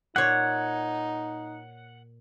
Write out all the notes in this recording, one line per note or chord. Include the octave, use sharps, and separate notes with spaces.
A#2 D#4 C#5 F#5